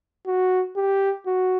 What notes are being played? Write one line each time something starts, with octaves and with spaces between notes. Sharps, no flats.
F#4
G4
F#4